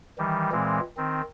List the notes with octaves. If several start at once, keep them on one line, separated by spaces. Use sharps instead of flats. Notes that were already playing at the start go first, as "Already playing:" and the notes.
D#3 E3 G3
A#2 E3 G#3 C4
D#3 C4